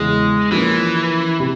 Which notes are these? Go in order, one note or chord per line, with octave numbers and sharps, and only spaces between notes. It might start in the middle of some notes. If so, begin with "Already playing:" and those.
Already playing: E2 C#3 E3 G#3
E3 F3 A#3 C#4
C3